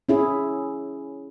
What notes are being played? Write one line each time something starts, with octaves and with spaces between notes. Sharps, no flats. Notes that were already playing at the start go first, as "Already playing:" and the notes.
C#4 E4 G#4